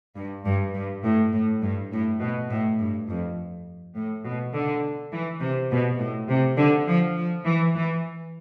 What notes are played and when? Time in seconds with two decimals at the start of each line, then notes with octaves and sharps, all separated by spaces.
0.17 G2
0.45 G2
0.74 G2
1.04 A2
1.33 A2
1.62 G2
1.92 A2
2.20 B2
2.49 A2
2.79 G2
3.08 F2
3.96 A2
4.24 B2
4.54 D3
5.12 E3
5.41 C3
5.71 B2
6.00 A2
6.29 C3
6.58 D3
6.88 F3
7.16 F3
7.46 E3
7.75 E3